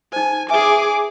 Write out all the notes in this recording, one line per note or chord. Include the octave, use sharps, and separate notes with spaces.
D#4 C5 G#5
G#4 B4 E5 G#5 D6